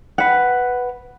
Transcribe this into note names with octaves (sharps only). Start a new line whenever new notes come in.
B4 F#5